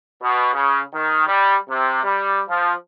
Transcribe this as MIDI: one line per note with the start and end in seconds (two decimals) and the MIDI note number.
0.22 0.49 47
0.53 0.80 49
0.93 1.26 51
1.27 1.55 55
1.69 1.99 48
2.03 2.40 55
2.48 2.72 53